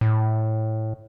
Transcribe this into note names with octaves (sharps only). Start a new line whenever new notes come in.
A2